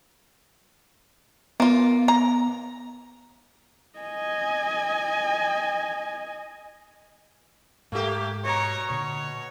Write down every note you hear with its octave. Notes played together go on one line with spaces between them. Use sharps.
A#3 B3 F4
A#5
D#5 G#5
G#2 A3 A#3 G4
B2 C#5 A#5
A#2 D3 C#5